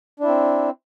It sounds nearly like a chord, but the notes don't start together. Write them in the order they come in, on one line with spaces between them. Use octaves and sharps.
D4 E4 C4